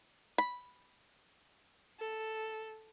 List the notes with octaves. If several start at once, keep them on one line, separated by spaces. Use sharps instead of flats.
B5
A4